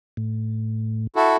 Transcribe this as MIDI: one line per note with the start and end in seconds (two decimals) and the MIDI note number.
0.17 1.07 45
1.16 1.37 64
1.16 1.37 66
1.16 1.37 69